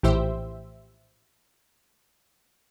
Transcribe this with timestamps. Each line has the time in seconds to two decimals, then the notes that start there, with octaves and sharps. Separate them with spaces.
0.03 A#1 A2 E3 G4 C5 E5